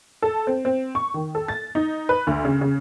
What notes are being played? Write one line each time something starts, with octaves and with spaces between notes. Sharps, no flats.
A4
C4
C4
C#6
D#3
A4
A6
D#4
B4
D2
C#3
C#3